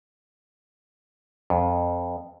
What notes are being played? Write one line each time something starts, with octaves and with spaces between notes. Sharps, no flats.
F2